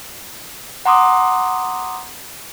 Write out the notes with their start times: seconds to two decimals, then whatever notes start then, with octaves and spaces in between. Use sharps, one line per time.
0.85 F#5 A#5 C6 D6 D#6